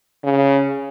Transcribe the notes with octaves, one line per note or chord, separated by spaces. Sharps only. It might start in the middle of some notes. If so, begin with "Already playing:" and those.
C#3